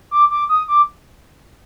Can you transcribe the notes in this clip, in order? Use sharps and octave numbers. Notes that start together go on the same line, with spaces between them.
D6
D6
D#6
D6